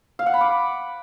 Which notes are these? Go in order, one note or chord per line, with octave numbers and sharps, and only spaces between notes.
F5
F#5
B5
D6